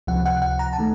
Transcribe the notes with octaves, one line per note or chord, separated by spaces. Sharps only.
C#2 C3 F3 F#5
F#5
F#5
A#5
A5
D#3 A3